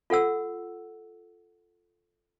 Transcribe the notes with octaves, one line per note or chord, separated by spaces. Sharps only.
F4 A4 F#5 E6